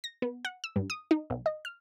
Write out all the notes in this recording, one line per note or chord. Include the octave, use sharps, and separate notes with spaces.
A#6
B3
F#5
E6
G2
D#6
D#4
B1
D#5
F6